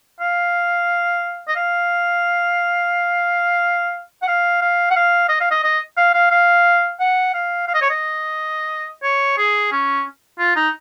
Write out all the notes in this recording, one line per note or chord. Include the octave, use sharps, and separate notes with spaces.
F5
D#5
F5
F#5
F5
F5
F#5
F5
D#5
F5
D#5
D#5
F5
F5
F5
F#5
F5
F5
D#5
C#5
D#5
C#5
G#4
C#4
F4
D#4